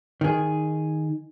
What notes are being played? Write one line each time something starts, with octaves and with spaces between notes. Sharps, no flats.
D#3 G#4